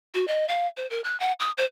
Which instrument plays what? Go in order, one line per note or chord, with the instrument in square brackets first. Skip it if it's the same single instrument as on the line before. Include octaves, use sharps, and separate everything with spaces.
[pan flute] F#4
D#5
F5
C5
A#4
F#6
F#5
D#6
C5